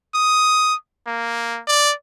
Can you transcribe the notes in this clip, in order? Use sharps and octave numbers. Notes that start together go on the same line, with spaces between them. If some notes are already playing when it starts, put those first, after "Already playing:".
D#6
A#3
D5